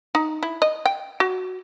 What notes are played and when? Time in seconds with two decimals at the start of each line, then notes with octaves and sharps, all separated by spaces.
0.15 D#4
0.43 E4
0.62 D#5
0.86 G5
1.20 F#4